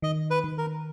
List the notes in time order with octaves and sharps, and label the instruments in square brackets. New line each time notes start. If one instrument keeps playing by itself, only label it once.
[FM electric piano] D#3 [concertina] D#5
[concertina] B4
[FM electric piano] D#3
[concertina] A#4